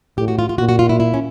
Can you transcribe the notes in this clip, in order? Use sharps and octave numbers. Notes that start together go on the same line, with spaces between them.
A2 G4
F#4
F4
F4
A#2 F#4
F#4
F4
E4
E4
C#4